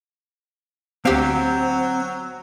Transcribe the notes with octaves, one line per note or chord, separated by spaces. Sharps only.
D2 F#3 C4 G4 F5